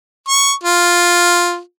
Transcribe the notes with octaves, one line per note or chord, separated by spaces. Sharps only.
C#6
F4